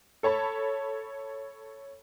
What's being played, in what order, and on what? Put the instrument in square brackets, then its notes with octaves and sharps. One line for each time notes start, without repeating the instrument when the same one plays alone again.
[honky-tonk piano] A4 C#5 A5 B5